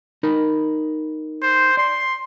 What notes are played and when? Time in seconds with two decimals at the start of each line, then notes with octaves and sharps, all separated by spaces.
0.23 D#4 A#4 B5
1.42 C5
1.77 D5 C6